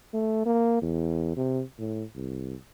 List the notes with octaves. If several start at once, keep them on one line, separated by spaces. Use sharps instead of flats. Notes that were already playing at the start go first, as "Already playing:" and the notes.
A3
A#3
E2
C3
A2
C2